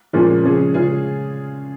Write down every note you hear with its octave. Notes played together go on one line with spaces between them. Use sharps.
A#2 F3 G#3 C#4 F4
C#3 F3 G#3 C#4 G#4
C#3 G#3 C#4 F4 G#4